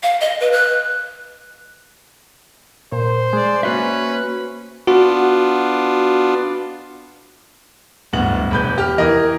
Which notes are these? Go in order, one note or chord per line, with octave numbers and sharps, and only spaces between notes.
F5
D#5
B4
F#6
A#2 C5
G#3 D5
A#3 C#4 F#4 B4 C5 E5
B3 D4 F4 F#4
D1 G2 B3 F#7
E1 B4 G6
G4 F6
E3 A#4 D#5